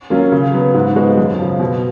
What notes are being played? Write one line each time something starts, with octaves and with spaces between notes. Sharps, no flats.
F#3 A#3 C#4 F4
C#3
F#3 B3
G#2
F3 G#3 B3 F#4
F#2
C#3 F3
B2